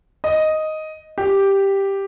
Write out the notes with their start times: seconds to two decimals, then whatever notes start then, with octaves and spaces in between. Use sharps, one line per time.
0.24 D#5
1.18 G4